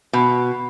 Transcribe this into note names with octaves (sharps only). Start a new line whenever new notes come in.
B2